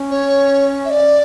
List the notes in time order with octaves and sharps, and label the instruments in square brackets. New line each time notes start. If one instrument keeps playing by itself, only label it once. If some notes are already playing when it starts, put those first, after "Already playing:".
Already playing: [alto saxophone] C#4
[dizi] C#5
E5
D5